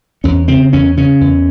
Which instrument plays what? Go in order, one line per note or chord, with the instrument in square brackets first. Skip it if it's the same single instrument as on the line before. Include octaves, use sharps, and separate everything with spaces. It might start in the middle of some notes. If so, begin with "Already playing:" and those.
[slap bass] E2 C#4
C#3 C4
E2 C#4
C#3 C#4
E2